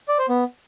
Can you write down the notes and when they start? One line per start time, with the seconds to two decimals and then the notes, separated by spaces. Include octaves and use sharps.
0.08 D5
0.19 C5
0.29 B3